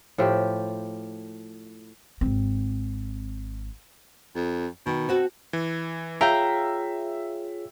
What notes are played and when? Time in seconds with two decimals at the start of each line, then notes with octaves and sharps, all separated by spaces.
0.18 A2 F3 G4
2.21 G#1 C4
4.35 F2
4.86 B2 D#3
5.09 C4 F#4 A4
5.53 E3
6.21 F4 G#4 C#5 E5 F5 G5 A#5